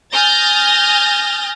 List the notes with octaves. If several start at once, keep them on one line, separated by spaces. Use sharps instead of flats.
G#5 D#6 F6 G6 A6 A#6